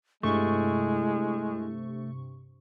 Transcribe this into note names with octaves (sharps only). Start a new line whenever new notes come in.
G2 C3 G#3 A3 E4 C#6